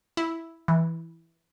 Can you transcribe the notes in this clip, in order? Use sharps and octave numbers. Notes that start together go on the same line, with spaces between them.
E4
E3